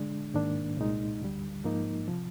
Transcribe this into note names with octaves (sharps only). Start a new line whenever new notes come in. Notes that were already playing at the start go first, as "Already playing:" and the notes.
Already playing: D3 G#3 D4
G#2 D#3 A#3 D4
C2 A#2 G#3 D#4
D2 D3 G3
G#2 F3 A#3 D#4
C3 F3